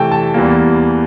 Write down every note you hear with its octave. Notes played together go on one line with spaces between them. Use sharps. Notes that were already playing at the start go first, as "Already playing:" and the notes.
Already playing: C3 E3 A3 G5 A5
A5
E2 E3 G3 A#3